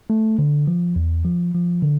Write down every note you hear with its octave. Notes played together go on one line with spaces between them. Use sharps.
A3
D3
F3
E2
F3
F3
D3